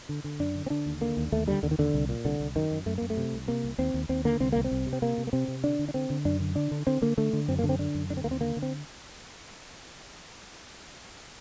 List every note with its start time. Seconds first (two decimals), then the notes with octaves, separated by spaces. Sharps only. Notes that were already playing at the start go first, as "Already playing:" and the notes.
0.09 D3
0.24 D3
0.40 F#2 D4
0.55 D3
0.66 C4
0.70 D3 D4
0.86 D#2
1.01 D3 A#3
1.17 D#2
1.32 D#2 A3
1.47 D3 G3
1.63 D#2 D3
1.71 D#3
1.78 D#2 D3
1.94 C2
2.09 A#2
2.25 C2 D3
2.40 C2
2.56 F#2 D#3
2.71 F#2
2.86 F#2 A3
2.98 F#2 A#3
3.10 A3
3.17 C3
3.33 C2
3.47 C3 A#3
3.63 C2
3.78 D#2 C4
3.94 D#2
4.09 D#2 C4
4.25 D3 A#3
4.40 C2 C4
4.52 C2 A#3
4.64 C4
4.71 C2
4.86 C3
4.93 C4
5.02 C3 A#3
5.18 C3
5.27 A#3
5.33 C3 C4
5.48 C3
5.63 D3 D4
5.79 D3
5.88 D4
5.94 D3 C4
6.10 D3
6.25 F#2 D4
6.40 D3
6.56 D3 D4
6.71 D3
6.87 D3 C4
7.02 D3 A#3
7.17 D3 A3
7.33 D3
7.48 F#2 C4
7.59 A#3
7.64 D3
7.69 C4
7.79 D3 D4
7.95 F#2
8.10 D3 D4
8.17 C4
8.24 D#2 A#3
8.31 C4
8.41 D3 A#3
8.56 D3
8.62 C4